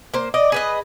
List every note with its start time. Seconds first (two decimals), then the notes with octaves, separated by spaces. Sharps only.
0.14 A#3 C5
0.34 D5 D#5
0.52 G#4 B4 D#5